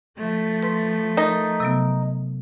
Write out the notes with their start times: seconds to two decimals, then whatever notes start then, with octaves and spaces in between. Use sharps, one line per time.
0.18 F3 A3
0.63 B4 C6
1.17 D#4 A#4 B4 A#5
1.60 C3 F#3 B3